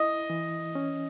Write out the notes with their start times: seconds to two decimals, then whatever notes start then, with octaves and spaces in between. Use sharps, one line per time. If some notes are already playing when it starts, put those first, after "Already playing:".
Already playing: E4 D#5
0.30 E3
0.75 C#4